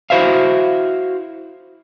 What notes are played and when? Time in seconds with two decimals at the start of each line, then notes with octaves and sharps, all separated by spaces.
0.10 E4 F#4 C5 E5 F5